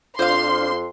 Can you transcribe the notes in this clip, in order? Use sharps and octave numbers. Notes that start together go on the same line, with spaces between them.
F2 D4 F4 C5 F5 C6